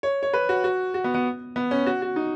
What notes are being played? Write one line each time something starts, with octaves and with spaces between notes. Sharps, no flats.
C#5
C#5
B4
F#4
F#4
F#4
B3
B3
B3
C#4
F#4
F#4
D#4